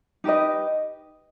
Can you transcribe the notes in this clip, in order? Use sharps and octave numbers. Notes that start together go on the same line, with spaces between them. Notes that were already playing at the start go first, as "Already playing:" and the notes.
D#4 G4 B4 D#5